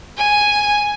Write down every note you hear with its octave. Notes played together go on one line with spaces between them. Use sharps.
G#5